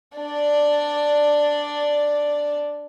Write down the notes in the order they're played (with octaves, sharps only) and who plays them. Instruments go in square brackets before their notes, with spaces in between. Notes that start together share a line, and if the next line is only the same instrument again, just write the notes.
[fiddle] D4 D5